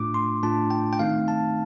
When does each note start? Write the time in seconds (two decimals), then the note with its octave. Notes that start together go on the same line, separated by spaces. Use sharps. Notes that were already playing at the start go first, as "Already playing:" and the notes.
Already playing: A2 A3 D4 F4 D6
0.14 C6
0.43 A2 A3 D4 F4 A5
0.70 G5
0.93 G5
0.99 D#3 A3 C4 D#4 F5
1.28 A5